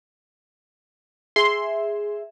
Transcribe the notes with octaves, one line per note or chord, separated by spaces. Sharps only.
G#4 E5 C6